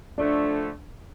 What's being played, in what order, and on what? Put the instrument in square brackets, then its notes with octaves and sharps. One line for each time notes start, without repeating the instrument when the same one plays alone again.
[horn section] D3 F3 A3 [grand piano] D4